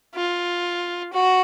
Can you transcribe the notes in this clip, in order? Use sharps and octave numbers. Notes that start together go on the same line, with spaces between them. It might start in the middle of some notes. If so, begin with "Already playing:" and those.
F4
F#4